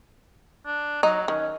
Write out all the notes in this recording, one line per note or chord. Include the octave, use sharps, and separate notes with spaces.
D4
F#3 D#4
D#3 C#4